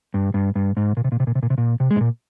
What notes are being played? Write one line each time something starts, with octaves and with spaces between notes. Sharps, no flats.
G2
G2
G2
G#2
A#2
C3
A#2
C3
A#2
C3
A#2
C3
A#2
C3
G#3
G#2
A#2